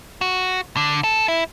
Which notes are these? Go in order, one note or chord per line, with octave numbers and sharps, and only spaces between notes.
F#4
D3
A4
E4